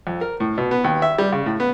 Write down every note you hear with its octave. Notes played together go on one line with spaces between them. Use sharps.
F2
A#4
A2
B2
B3
D#2
E5
G3
C#3
A2
B3